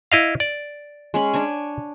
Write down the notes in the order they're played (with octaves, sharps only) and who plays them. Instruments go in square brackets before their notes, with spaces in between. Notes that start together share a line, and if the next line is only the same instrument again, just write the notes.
[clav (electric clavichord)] E4 D#5 F5
D5
[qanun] G#3 C#4 B5
D4 C#5 G#5